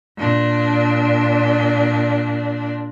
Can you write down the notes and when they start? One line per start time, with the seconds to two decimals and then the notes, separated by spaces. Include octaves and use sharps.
0.18 A#2 D4